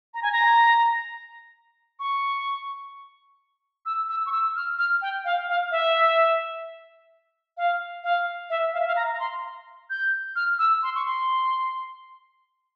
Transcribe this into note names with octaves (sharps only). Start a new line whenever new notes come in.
A#5
G#5
A#5
C#6
E6
E6
C#6
E6
F6
F6
G5
F5
F5
E5
F5
F5
E5
F5
E5
F5
A#5
A#5
C6
G6
F6
E6
C6
C#6
C6